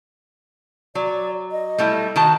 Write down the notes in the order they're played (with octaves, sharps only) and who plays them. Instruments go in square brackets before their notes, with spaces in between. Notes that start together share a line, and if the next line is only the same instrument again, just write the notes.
[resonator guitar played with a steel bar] F#3 [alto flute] D5
[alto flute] D#5
[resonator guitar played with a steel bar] G3 A3 E4
D#3 F#4 A5